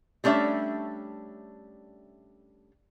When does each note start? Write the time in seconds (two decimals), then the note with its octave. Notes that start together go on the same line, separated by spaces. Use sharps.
0.24 G3 A3 C#4 D4 E5